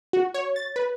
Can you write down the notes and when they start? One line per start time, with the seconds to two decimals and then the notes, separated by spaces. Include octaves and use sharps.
0.13 F#4
0.34 C#5
0.56 A6
0.76 B4